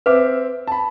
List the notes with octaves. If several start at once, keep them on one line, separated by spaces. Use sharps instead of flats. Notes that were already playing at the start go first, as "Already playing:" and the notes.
C4 B4 E5 D6
A5 B5